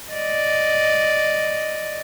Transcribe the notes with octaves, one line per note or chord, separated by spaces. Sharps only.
D5 D#5